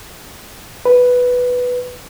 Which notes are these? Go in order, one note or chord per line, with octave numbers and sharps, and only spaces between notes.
B4